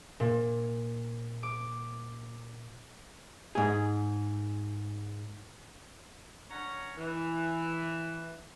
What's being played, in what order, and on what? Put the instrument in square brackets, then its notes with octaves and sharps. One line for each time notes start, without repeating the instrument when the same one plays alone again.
[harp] A#2
D6
[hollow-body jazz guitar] G#2 G#4
[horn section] C#4 D4 C#5 F#5 A#5
E3